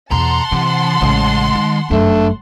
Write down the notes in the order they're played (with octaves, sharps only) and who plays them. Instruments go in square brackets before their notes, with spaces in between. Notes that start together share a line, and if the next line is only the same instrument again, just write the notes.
[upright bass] E2 B2 [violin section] F#5 A5 C6 [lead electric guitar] A#5
[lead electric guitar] C3 [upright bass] E3
[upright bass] A1 C#3 [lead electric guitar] G#3
[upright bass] D#3
[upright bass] G1 F#2 [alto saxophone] A3 [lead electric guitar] D4